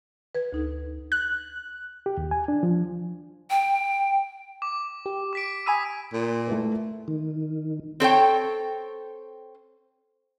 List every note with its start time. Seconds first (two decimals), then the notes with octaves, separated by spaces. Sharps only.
0.35 B4 G#6
0.52 D2 D#4 A4
1.12 F#6
2.06 G4
2.17 D#2
2.31 G#5
2.48 D4
2.63 F3
3.50 G5
4.62 D6
5.06 G4
5.33 D6 B6 D7
5.66 G#5 B5 D#6 E6 B6 D#7
6.13 A#2
6.47 A3 E4 B4
7.08 D#3
8.00 C4 A4 C#5 G5